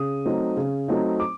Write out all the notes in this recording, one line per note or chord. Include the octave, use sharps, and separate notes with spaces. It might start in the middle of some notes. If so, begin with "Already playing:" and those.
Already playing: C#3 D#6
F#3 A3 C4 D#4
C#3
F#3 A3 C4 D#4
D6